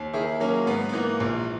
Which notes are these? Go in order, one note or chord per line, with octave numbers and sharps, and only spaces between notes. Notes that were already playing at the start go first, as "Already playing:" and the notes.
Already playing: D#2
D#3 E4 G#4
F#3 A#3 C#4
G#2 B3
B3
E3 A#3
A#1